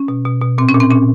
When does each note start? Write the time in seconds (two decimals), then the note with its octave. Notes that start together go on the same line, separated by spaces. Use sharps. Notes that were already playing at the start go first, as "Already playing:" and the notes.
Already playing: C#4
0.08 B2
0.25 B2
0.41 B2
0.58 A#2 C4
0.69 C#4
0.74 A#2
0.80 C4
0.91 A#2 C#4